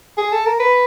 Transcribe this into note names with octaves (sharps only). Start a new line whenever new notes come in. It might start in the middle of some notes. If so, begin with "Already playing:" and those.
G#4
A4
A#4
B4